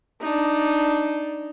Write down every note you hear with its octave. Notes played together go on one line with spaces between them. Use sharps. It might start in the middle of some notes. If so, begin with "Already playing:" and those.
D4 D#4